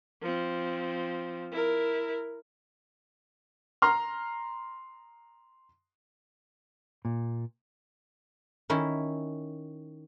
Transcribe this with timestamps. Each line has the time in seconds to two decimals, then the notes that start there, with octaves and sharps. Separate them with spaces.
0.22 F3 C4
1.52 E4 A#4
3.82 A#5 C6 F6
7.05 A#2
8.70 D#3 C#4 E4